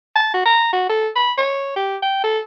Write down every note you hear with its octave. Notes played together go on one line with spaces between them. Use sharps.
A5
F#4
A#5
F#4
A4
B5
C#5
G4
G5
A4